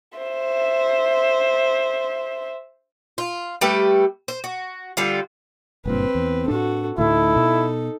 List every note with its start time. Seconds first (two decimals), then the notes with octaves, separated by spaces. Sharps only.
0.18 C5 E5
3.18 F4
3.61 G3 A3 G4 B4
4.28 C5
4.44 F#4
4.97 D3 G3 F4
5.85 F#1 G2 A#2 C4 B4
6.15 E2
6.48 A2 D4 F#4 A4
6.98 D2 A2 D#4 E4 A4
7.37 B2